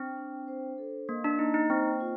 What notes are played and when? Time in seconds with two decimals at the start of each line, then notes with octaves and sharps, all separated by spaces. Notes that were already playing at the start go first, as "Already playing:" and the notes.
Already playing: C4 D4
0.17 D4
0.48 C5
0.78 A4
1.08 A#3 D#5
1.24 D4
1.39 A#3 D#4
1.54 D#4
1.70 C4 C5
2.00 F4